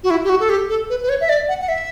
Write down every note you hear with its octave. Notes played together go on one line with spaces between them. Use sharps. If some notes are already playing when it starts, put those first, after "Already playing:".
F#4
E4
G4
F#4
A4
G4
A4
B4
B4
C#5
E5
D5
F#5
F#5
E5